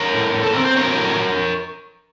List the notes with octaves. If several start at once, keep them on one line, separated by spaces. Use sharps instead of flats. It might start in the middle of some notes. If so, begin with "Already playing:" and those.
Already playing: A#4 C#5
A2
A2
A4
C4 A#4
C5
F#3 A#4 C#5
A2